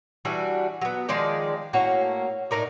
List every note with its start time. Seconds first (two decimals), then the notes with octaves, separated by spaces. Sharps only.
0.25 E3 G3 D4 F#4
0.81 F#3 B3
1.09 D#3 F3 G#3 D5
1.73 A2 A#3 C#4 F#4
2.51 A2 D#4 A#4 D5